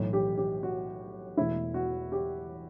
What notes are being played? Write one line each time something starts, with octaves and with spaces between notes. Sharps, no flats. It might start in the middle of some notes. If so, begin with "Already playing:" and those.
Already playing: B1 A2 E3
G4
G4
F#4
E1 E2 B2 A3 E4
F#4
G4